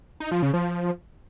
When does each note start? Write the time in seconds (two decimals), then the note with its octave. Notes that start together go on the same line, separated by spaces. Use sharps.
0.20 D#4
0.31 F3
0.42 C#3
0.54 F3